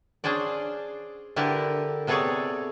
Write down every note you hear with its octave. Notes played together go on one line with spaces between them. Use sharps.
C#4 D4 G#4 C5 D5
D3 E4 G4 A#4 B4 A5
C3 B3 G#4 A4 C#5 D5